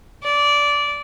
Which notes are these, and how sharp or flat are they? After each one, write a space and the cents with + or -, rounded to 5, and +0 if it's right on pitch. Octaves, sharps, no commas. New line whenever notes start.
D5 -15